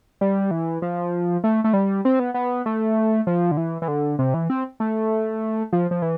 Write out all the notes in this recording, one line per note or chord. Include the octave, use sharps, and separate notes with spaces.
G3
E3
F3
A3
A3
G3
C4
B3
B3
A3
F3
D3
E3
E3
D3
C3
E3
C4
A3
F3
F3
E3